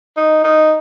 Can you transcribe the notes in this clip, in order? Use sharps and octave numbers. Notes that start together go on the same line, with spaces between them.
D#4
D#4